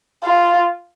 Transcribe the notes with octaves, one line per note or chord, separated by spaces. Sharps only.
F4